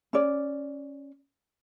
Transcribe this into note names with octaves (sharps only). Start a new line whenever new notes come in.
C#4 D5